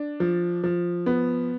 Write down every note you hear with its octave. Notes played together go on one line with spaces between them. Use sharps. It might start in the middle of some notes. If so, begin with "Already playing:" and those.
Already playing: D4
F3
F3
B3